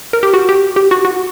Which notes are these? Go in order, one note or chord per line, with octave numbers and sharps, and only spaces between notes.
A#4
G4
F#4
G4
G4
F#4
F#4